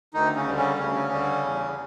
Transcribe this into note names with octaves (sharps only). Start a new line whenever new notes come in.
D2 D#3 D#4
C#3 C#4
D3 G3
C#3 C#4
D2 C#3 C#4
D3 G3
E2